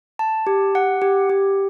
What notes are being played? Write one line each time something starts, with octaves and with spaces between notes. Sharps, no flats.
A5
G4
F#5
G4
G4